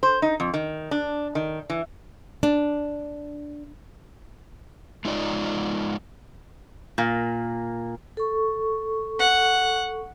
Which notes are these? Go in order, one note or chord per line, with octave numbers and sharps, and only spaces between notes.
C5
D#4
F2
D#3
D4
D#3
E3
D4
G#3 D#4 F4 D5 D#5
A#2 A#3
A4 C#6
F#5